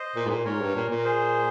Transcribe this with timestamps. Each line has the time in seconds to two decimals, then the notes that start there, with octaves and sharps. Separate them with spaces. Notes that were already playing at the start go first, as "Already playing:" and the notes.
Already playing: C5 D#5
0.16 A#2
0.26 G#2
0.30 A#2
0.45 G#2 A#4 C#5
0.60 G2
0.75 A#2
0.90 A#2
0.98 A#4
1.04 G#4 C5